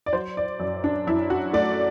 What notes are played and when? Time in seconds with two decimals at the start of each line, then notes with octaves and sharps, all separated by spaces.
0.06 D5
0.13 F#3 C5
0.37 D5
0.60 F#2
0.84 D4
1.07 F#2 E4
1.30 F#4
1.53 A3 D5